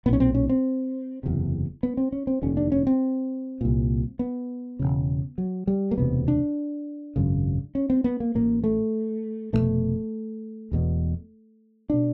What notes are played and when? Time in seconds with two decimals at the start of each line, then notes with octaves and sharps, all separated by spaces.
0.06 A#2 B3
0.09 B1 C#4
0.20 C4
0.34 C#4
0.49 C4
1.23 F#1 E2 C3
1.83 B3
1.97 C4
2.12 C#4
2.27 C4
2.42 F1 D#2 D3 C#4
2.57 D4
2.72 C#4
2.87 C4
3.61 C2 A#2
4.19 B3
4.79 E1 D#2 C#3
5.38 F#3
5.67 G3
5.91 A#3
5.98 E1 D2 C3 B3
6.28 D4
7.16 G#1 F#2 C#3
7.75 C#4
7.90 C4
8.04 B3
8.20 A#3
8.35 A1 A2 A#3
8.64 A3
9.53 E2 B2 A3
9.57 F1
10.72 E1 E2 B2
11.90 B2 D4